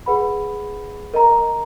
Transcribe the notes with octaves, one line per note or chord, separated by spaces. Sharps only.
G#4 B4 F#5 B5
A#4 D#5 A#5